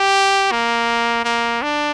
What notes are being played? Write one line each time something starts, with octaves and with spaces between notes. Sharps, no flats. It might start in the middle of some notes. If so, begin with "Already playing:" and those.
Already playing: G4
A#3
A#3
D4